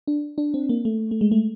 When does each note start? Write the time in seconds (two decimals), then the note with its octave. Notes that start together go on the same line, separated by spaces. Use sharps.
0.07 D4
0.38 D4
0.54 C4
0.69 A#3
0.85 A3
1.11 A3
1.21 G#3
1.32 A3